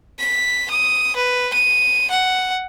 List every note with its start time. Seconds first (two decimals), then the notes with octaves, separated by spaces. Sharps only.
0.19 B6
0.71 D#6
1.16 B4
1.53 D#7
2.11 F#5